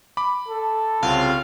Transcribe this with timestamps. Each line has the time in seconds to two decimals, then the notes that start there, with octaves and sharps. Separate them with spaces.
0.17 B5 D6
0.48 A4
1.03 C2 C#3 C4 F4 F5